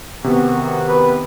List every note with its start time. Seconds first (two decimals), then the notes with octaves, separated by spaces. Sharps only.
0.24 C3 D#3 B3 F#4
0.89 B4